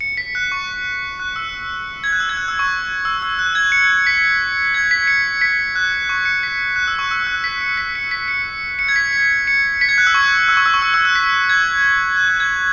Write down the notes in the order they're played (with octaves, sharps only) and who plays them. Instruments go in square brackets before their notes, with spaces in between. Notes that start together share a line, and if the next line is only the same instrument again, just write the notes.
[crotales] C#7
B6
F#6
C#6
F#6
E6
G#6
F#6
E6
G#6
F#6
E6
C#6
E6
E6
F#6
G#6
C#7
B6
G#6
B6
C#7
B6
F#6
C#6
C#7
B6
F#6
E6
C#6
E6
F#6
B6
C#7
B6
C#7
B6
C#7
C#7
G#6
B6
B6
C#7
B6
G#6
F#6
E6
C#6
E6
C#6
E6
C#6
E6
E6
F#6
B6
G#6
F#6
F#6
G#6